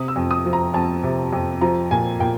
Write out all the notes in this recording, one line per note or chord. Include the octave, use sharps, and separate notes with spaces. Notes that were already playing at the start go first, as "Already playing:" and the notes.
Already playing: C3 D#6
E6
F2
D#6
F3
A#5
F2 A5
C3
F2
F3 A#5
A#2 G#5
A#2 G5